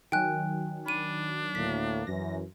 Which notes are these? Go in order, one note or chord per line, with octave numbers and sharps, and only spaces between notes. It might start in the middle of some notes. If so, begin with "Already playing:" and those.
D#3 F#3 G5 G#5 F#6
D4 B5 D#7
D2 A2 A#3 B6
F#2 E3 A#6